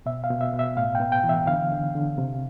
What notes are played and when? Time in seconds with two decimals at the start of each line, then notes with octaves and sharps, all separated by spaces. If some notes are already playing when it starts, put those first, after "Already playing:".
0.06 B2 E5
0.24 F5
0.30 B2
0.41 E5
0.53 B2
0.59 E5
0.77 A2 F5
0.95 G5
1.00 B3
1.12 G5
1.24 E3
1.29 E5
1.47 D3 F5
1.72 D3
1.95 D3
2.18 C3